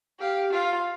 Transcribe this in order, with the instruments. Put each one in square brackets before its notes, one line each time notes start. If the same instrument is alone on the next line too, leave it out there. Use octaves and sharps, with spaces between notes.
[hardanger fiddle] G4 [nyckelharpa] F5
[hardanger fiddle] F4 [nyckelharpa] F5